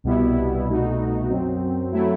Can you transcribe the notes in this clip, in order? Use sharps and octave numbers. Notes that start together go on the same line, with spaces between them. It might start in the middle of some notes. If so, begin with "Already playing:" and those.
C2 B2 G3 B3 E4
C2 B2 A3 D#4 F#4
F#2 F#3 C4
F#3 A3 E4